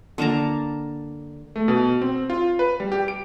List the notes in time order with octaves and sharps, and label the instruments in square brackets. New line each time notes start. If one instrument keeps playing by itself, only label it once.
[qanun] D3 A#3 A5 A#5
[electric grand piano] A3
B2
C4
F4
B4
G3
G4
D7